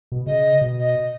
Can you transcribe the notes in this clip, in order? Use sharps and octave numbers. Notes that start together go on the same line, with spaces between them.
B2
C#3 D#5
B2
D#5